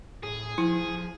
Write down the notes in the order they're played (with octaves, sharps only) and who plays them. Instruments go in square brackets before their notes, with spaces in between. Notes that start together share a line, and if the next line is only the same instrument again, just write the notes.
[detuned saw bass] A2 [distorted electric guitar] G#4
[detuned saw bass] F3 [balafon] E4